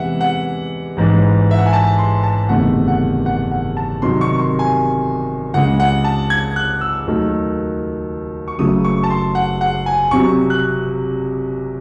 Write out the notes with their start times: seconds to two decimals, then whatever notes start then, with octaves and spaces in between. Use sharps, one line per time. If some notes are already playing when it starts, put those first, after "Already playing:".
Already playing: E2 C3 E3 G#3 E5 F#5
0.21 F#5
0.97 A1 G#2 E3 G#3
1.51 E5
1.58 F#5
1.66 G#5
1.73 A5
1.98 C6
2.23 A5
2.49 F#1 E2 C3 D#3 A3 F#5
2.88 F#5
3.26 F#5
3.51 F#5
3.77 A5
4.02 C2 C3 D#3 F#3 C6
4.21 C#6
4.39 C6
4.59 G#5
5.54 C#2 C#3 G#3 F#5
5.80 F#5
6.04 A5
6.30 G#6
6.56 F#6
6.81 E6
7.06 D#2 D#3 F#3 A3
8.48 C#6
8.59 F#1 F#2 C#3 F#3 A3 D#6
8.84 C#6
9.04 A5
9.10 C6
9.35 F#5
9.61 F#5
9.86 G#5
10.11 C2 C3 F#3 C#6
10.50 F#6